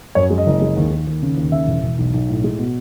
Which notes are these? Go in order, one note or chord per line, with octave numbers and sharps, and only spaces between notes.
F#2 C#5
G#3
D#5
F#1
G#3
D#2
D#2
D#2
C#3
D#2
C#3 E5
E1
E1
B1
B1
A2
G#3
B2